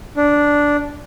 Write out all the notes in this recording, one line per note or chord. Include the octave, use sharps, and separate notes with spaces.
D4